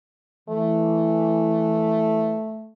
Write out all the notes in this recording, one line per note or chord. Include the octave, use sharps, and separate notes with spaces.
E3 A3